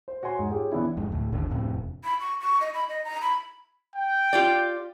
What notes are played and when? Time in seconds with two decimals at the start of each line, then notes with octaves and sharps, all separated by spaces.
0.08 C5
0.23 F#4 C#5 G#5 C6
0.39 G#2
0.51 F4 G4 G#4 C#5
0.72 E3 B3 D4 E4
0.97 F2 G#2
1.12 D2 A2
1.32 G#1 D#2 D3
1.50 D1 F2 A2 C3
1.74 E1
2.04 B5
2.20 C#6
2.41 C#6
2.61 D#5
2.74 B5
2.89 D#5
3.05 A#5
3.22 B5
3.96 G5
4.33 F4 G4 D5